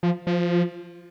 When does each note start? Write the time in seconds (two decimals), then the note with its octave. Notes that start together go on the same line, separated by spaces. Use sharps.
0.03 F3
0.27 F3